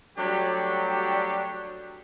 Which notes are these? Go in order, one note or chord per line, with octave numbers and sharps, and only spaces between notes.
F#3 G3 A3 D4 F#4 G4